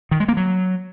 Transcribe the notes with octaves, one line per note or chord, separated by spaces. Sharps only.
D#3
G#3
A#3
F#3